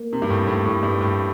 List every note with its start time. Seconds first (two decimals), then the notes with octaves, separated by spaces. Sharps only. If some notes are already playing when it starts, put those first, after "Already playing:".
Already playing: A#3
0.13 C3
0.22 G2
0.30 A2
0.47 A2
0.65 A2
0.83 G2
1.01 A2